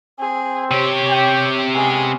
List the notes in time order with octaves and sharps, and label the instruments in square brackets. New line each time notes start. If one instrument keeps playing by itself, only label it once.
[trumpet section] C4 [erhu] G#4
[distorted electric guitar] C3 G4 [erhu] C#5
[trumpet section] G5
[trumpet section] G#3 B3 C#4 [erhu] G#4